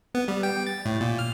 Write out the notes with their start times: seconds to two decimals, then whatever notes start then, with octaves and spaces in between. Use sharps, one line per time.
0.15 B3
0.28 G3
0.43 G5
0.67 A6
0.85 A2
1.01 A#2
1.19 F6